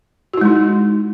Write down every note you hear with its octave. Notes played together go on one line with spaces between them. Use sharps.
G#3 D#4 E4 F#4